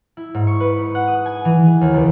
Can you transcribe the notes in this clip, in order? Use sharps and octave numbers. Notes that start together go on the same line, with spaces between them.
E4
G#2
C#6
B4
D#4
F#5
D#6
G#5
E3
G#4
D#2
C#2